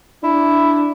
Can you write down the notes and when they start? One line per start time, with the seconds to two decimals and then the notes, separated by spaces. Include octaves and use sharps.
0.24 D4 E4